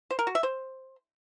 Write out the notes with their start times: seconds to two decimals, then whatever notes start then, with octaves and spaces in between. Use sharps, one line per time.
0.11 C5
0.19 A#4
0.27 F#4
0.35 E5
0.43 C5